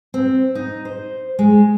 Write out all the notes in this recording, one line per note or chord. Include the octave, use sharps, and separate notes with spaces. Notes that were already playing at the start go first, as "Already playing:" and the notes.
C4
D#4
C5
G#3